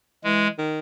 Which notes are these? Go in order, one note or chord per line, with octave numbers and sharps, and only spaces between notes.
E3 G#3
D#3